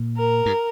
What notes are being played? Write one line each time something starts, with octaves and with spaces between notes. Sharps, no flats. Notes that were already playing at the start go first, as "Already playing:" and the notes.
Already playing: A#2
A#4
G2